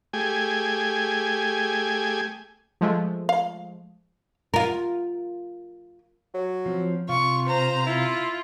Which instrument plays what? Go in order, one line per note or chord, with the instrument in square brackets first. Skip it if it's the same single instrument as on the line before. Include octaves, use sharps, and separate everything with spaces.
[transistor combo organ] A3 G4 G#4 G#5
[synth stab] F3 G#3 A3
[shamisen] F5
[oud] F4 A#4
[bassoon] F#3
[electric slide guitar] F3 C4
[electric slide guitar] C3 [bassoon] F4 [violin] C#6
[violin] C5 A#5
[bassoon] E4 [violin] F4